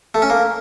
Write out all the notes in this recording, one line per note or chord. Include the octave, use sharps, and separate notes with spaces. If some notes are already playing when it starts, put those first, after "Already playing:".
A3
C#4
A#3